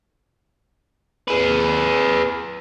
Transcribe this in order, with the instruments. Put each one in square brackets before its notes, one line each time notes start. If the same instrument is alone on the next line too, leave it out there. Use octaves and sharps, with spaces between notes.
[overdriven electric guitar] G#4 B4